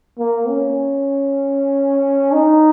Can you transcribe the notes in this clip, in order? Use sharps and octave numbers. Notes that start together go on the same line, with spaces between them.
A#3
C#4
D#4